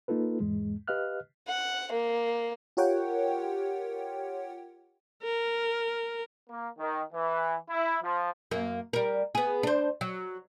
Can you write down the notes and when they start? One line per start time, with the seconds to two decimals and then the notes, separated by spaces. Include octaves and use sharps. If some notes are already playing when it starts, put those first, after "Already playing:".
0.08 A#3 D#4 F4 A4 B4
0.40 E2 G#2 G#3
0.88 G4 B4 D#5 F5 F6 F#6
1.48 F#5
1.92 A#3
2.77 F4 G4 A#4 C#5 F#5 G5
5.23 A#4
6.50 A#3
6.79 D#3
7.14 E3
7.70 E4
8.03 F3
8.51 F#2 A#3
8.93 G3 A#4
9.35 B3 G#4
9.63 D4 C5
10.01 F#3